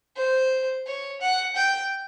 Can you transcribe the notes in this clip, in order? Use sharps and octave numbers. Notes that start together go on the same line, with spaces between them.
C5
C#5
F#5
G5